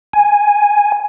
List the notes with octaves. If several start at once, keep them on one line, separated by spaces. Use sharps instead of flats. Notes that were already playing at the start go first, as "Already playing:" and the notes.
G#5